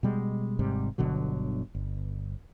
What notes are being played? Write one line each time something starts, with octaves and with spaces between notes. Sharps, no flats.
B2 G3 G#3
G#1 G#2 C3 G3
G1 B2 D3 F#3
G1